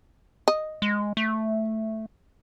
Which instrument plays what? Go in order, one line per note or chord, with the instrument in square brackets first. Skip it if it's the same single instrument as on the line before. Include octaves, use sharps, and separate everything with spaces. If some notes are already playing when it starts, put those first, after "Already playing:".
[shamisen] D#5
[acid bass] G#3
A3